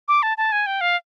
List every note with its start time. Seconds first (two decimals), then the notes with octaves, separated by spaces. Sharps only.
0.08 D6
0.23 A5
0.38 A5
0.52 G#5
0.66 G5
0.81 F5